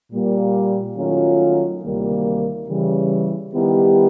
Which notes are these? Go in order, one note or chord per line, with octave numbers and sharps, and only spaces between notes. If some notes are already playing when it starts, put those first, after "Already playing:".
A#2 G3 A#3
D#3 F#3 A3 C#4 F4
D2 C3 D#3 G3 A#3
C#3 E3 G3
D#3 G3 B3 E4 G4